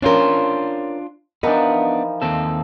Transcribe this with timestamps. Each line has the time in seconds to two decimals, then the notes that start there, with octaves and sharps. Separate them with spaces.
0.02 C#4 D4 F4 A#4 C5
1.43 E3 F3 B3 D4 D#4 A#4 D#5
2.22 D#2 C4 A4